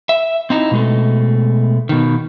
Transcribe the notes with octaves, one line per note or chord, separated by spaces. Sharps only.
E5
C4 D#4 E4
B2 G#3 A3
B2 D#3